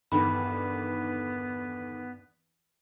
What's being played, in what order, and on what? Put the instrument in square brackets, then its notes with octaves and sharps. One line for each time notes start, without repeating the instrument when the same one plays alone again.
[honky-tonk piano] E2 D3 D#3 [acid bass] G2 [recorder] B3 [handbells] B5